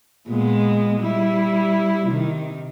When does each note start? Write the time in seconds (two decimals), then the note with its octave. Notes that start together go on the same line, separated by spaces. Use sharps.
0.27 A#2 G#3 B3
1.00 G3 E4
2.06 C3 D#3